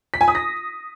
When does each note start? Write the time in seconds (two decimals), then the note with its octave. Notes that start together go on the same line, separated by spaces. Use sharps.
0.14 B6
0.21 G#5
0.28 D#6
0.35 A#6